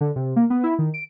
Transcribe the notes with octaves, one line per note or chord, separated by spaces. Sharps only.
D3
C3
A#3
B3
E4
D#3
D7